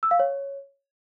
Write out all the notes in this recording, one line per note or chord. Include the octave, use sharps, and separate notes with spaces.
E6
F5
C#5